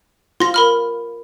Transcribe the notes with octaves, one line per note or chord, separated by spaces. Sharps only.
F4 C6 A#6
A#4 B5 F6